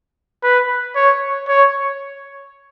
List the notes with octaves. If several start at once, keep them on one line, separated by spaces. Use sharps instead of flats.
B4
C#5
C#5